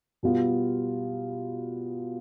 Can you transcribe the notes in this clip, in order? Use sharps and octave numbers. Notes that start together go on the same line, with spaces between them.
B2 G3 B3 F4